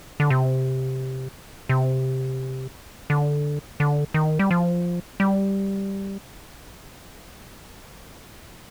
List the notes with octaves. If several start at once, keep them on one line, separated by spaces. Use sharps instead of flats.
D3
C3
C3
D3
D3
D#3
G3
F3
G3